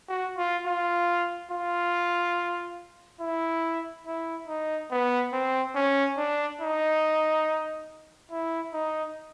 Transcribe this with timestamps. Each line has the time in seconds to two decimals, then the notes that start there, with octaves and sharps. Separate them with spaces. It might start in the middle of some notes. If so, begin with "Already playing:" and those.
0.09 F#4
0.37 F4
0.66 F4
1.51 F4
3.21 E4
4.06 E4
4.48 D#4
4.91 B3
5.33 C4
5.75 C#4
6.17 D4
6.61 D#4
8.31 E4
8.73 D#4